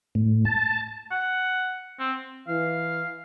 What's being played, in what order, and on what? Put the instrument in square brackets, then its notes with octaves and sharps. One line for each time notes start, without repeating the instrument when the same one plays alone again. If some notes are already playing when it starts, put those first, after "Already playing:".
[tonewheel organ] A2
A5
[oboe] F#5
C4
[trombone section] E3 [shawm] F5